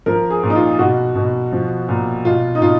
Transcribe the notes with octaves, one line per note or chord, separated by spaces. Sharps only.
F3 A#4
G#4
A#2
D#4
F4
B2 F#4
B2
F3
A#2
B2 F4
D#4
B2 F4